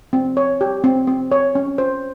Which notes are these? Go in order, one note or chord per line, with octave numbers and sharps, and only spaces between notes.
C4
C#5
G4
C4
C4
C#5
C#4
C5